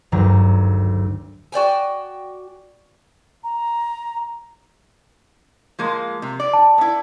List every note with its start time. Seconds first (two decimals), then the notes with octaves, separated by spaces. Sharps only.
0.12 G#1 D2 G2 F#3 A#5
1.52 F#4 D5 G5 G#5
3.44 A#5
5.79 F3 G#3 A#3
6.22 C3
6.40 D5
6.53 A5
6.78 B3 E4